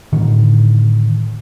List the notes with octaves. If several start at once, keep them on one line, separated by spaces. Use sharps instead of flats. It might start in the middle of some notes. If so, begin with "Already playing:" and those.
A2 D3 D#3